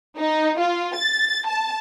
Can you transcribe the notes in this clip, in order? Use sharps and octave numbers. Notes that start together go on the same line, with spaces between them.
D#4
F4
A6
A5